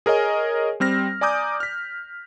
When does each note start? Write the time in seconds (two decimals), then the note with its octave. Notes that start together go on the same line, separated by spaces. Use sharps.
0.06 G#4 A#4 C#5 D#5 G#5
0.80 G3 C4 F6 A#6
1.21 D5 G#5 A#5 D6 D#6 G6
1.60 F6 B6